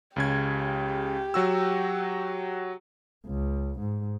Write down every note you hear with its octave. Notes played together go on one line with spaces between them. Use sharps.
C#2 C#3 G4 G#6
F#3 F#4 E6
C#2
G#2